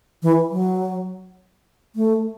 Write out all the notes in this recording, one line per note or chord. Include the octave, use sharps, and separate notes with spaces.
E3
F#3
A3